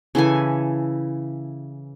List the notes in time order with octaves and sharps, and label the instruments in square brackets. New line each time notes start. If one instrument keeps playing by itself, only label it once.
[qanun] C#3 E3 A4 G#5